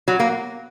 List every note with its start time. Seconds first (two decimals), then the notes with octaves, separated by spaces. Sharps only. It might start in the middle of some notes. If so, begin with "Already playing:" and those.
0.08 F#3
0.20 A#3